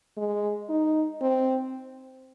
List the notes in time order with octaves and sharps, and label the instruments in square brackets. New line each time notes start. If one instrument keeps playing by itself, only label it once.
[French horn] G#3
D#4
C4